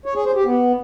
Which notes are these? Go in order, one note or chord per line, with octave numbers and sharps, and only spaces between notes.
C#5
G#4
C5
G4
B3